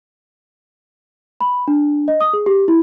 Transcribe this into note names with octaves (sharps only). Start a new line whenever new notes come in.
B5
D4
D#5
D#6
G#4
G4
E4